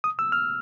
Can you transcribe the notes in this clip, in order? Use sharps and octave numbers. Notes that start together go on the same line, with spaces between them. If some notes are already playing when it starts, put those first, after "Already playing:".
D#6
E6
F6